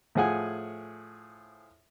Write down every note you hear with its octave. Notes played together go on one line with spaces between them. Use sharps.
A2 F3 G#4 F#5 G#5